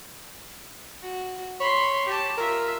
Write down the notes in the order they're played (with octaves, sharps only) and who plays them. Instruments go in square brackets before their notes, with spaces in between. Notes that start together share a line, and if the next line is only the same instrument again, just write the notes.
[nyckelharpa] F#4
[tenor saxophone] C#5 [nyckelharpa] B5 C6
[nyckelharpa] G4 A5
[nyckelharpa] F4 E5 [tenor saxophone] A#4